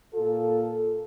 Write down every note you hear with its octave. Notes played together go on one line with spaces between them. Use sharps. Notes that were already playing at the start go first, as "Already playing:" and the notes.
A#2 F4 A4